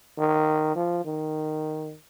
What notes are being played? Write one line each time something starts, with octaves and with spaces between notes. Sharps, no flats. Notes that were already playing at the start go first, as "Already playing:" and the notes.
D#3
F3
D#3